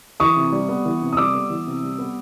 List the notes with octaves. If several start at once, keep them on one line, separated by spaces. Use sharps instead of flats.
E3 C#6 D#6
C3
G3
B3
E3
C3
D#6
G3 D6 E6
B3
E3
C3
G3
B3